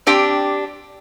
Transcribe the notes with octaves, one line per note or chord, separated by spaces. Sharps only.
C4 D4 G4 G5